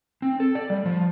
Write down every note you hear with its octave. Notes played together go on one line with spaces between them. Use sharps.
C4
A4
D5
G3
F3